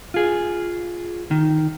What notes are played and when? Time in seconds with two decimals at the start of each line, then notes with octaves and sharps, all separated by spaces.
0.14 F4 G#4
1.31 D#3